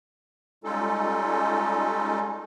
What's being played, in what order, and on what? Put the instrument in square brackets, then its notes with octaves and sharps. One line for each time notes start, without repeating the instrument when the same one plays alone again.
[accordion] G3 G#3 C#4 D#4 F4 A4